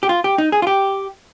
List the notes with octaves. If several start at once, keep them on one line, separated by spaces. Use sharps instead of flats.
G4
F4
G4
D#4
G#4
F4
G4